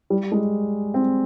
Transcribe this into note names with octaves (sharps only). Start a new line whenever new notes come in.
G3
G#3
C4